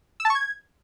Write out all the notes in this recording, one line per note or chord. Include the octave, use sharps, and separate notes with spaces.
E6
A5
C#6
G#6